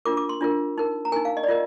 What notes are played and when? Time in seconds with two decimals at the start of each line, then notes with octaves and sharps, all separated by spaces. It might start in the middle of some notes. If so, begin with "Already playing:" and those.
0.05 D4 F4 A#4 D6
0.17 D6
0.29 C6
0.41 D4 F4 A#4
0.78 D#4 A#4
1.05 A#5
1.12 D#4 A#4 G#5
1.25 F5
1.37 D#5
1.43 D5
1.48 F4 A#4 D#5